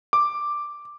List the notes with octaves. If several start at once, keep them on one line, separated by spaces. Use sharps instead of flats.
D6